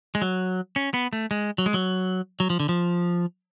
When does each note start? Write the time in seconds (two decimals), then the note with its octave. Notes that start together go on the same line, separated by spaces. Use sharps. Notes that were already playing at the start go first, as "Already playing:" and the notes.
0.15 G#3
0.22 F#3
0.76 C#4
0.94 B3
1.13 A3
1.31 G#3
1.58 F#3
1.66 G#3
1.74 F#3
2.40 F#3
2.50 F3
2.60 D3
2.69 F3